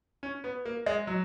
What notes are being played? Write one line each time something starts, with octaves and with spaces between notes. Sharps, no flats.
C#4
B3
A#3
G#3
F#3